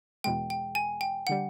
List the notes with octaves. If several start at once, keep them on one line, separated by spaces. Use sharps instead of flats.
E2 B2 G#3 G5
G5
G#5
G5
D3 G3 F#5